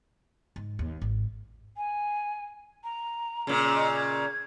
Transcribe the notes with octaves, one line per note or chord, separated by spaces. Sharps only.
G#2
D#2
G#1
G#5
A#5
A#2 C#3
D#5
G#6